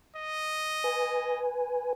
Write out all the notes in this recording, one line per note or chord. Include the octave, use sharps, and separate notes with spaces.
D#5
B4 G#5